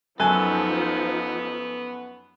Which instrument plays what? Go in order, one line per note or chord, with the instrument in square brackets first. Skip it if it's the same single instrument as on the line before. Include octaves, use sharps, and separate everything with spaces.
[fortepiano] F#2 G#5 F#6 [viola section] F3 D#4 [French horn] B3 [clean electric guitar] A4